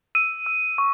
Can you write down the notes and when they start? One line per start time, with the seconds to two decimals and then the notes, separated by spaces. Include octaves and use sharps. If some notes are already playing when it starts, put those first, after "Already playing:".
0.15 E6 D#7
0.46 E6
0.78 C#6